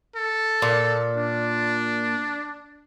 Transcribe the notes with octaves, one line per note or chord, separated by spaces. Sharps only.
A4
A#2
D4